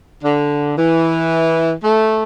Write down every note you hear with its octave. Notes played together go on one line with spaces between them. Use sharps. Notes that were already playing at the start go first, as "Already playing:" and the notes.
D3
E3
A3